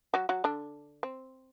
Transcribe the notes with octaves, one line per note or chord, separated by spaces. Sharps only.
F#3 F#4
F#3 F#4
D3 D4
C4